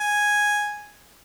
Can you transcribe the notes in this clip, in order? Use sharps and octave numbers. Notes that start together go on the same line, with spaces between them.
G#5